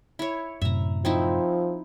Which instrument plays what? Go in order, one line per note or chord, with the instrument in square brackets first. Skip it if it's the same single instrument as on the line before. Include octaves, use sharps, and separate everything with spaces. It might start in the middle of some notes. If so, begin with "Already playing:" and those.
[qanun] E4 C#5
[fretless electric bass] F#2 A2 C3 [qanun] E5 A#5
[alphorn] F3 [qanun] C4 D#4 E4